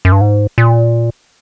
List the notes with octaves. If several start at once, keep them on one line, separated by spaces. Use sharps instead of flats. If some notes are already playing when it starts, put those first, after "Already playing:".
F#2
G2
G#2
A#2